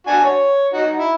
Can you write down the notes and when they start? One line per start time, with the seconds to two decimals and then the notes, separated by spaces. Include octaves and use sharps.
0.07 D4 F#4 G#5
0.24 C#5
0.73 D#4 F#4
0.97 E4